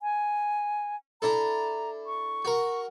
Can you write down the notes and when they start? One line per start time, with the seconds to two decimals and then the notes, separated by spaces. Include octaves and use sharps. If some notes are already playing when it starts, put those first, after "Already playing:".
0.01 G#5
1.22 D4 E4 A4 A#5
2.06 C#6
2.45 F#4 A#4